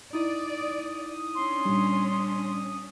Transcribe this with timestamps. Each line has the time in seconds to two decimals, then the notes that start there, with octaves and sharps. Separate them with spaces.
0.13 D#4 E4 D5 D#6
1.35 C#4 D4 C6
1.65 A#2 G3